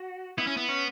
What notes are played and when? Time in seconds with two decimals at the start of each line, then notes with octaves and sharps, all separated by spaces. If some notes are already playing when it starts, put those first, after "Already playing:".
Already playing: F#4
0.38 B3 E4
0.47 C#4
0.57 B3
0.69 C#4